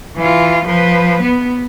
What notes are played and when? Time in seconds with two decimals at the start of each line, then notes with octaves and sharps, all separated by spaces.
0.17 E3 F4
0.66 F3 B4
1.22 B3